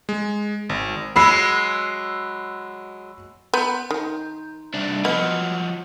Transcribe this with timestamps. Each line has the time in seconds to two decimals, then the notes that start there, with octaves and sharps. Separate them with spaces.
0.09 G#3
0.69 G#1
1.16 F#3 G#3 B5 E6 C7
3.54 B3 A#5 C6 G6
3.91 D#3
4.74 C2 D4
5.05 F3 F#3 B3 D#5 F#5 F6